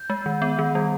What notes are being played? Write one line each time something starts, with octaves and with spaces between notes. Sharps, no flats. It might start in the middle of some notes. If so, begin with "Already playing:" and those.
Already playing: G6
G#3
D#3
B3
D#3
G3